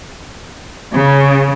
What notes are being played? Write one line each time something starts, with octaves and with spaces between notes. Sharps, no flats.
C#3